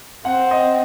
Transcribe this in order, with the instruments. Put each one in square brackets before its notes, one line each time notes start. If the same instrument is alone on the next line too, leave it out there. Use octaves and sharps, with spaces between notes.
[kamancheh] C4 [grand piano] F#5
[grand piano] D#5